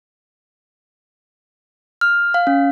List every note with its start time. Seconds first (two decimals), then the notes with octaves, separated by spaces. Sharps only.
2.01 F6
2.34 F5
2.47 C#4